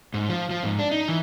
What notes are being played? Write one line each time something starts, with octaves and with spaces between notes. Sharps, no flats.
G#2
F3
F3
G#2
D4
D#4
E3